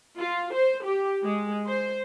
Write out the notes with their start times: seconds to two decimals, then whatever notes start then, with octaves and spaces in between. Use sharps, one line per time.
0.19 F4
0.54 C5
0.85 G4
1.24 G#3
1.69 C5